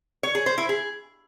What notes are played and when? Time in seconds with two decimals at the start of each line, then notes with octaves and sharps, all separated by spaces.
0.23 C#5
0.35 G#4
0.46 C5
0.58 E4
0.69 G#4